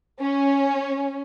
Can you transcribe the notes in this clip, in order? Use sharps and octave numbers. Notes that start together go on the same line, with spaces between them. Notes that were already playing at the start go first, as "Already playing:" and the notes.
C#4